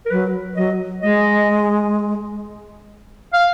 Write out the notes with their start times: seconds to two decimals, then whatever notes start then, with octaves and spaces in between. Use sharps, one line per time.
0.06 A#4
0.10 F#3 B4
0.56 F#3 D#5
1.03 G#3 D#5
3.33 F5